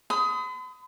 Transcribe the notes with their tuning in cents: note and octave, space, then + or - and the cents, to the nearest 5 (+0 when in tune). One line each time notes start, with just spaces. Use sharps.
B5 +45 D#6 +20